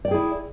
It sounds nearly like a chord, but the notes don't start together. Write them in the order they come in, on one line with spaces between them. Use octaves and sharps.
D5 G5 G#4 E4